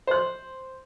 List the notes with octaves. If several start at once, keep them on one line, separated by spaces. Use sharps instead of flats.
C5 F#6